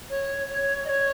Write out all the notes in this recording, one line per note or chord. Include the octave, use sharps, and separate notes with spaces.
C#5
C#5
D#5
C#5